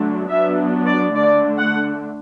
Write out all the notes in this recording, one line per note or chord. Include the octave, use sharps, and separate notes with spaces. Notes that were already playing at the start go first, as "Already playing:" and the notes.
Already playing: D3 F#3 A3 D4
F#3 B3 D4 E5
D5
D3 A3 D4 D5
F#5